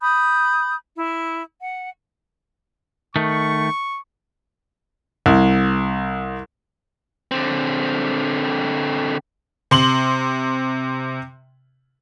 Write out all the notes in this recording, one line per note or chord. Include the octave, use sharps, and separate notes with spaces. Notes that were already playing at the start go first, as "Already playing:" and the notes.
B5 D#6 G6
E4
F#5
D#3 A3 C#6
C2
D3 C4
C3 C6 F#7